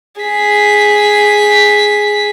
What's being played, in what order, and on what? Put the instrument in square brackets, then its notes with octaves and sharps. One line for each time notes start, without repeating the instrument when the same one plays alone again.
[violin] G#4 B6